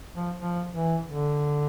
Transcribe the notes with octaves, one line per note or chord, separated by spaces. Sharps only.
F3
F3
E3
D3